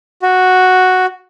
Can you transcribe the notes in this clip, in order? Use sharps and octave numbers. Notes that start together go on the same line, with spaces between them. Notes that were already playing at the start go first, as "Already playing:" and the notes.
F#4